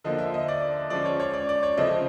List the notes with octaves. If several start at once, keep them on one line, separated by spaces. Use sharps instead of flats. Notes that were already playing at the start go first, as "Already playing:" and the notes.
D3 F3 A#3 D#5
E5
D#5
D5
F3 G#3 C#4 D5
C#5
C#5
D5
D5
C#5
C#3 F3 A3 C4 D#5